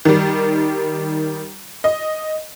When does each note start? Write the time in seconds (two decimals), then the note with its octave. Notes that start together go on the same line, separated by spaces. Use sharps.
0.05 D#3 G3
1.84 D#5